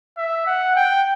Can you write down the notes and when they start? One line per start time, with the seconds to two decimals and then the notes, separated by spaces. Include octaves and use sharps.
0.17 E5
0.46 F#5
0.76 G5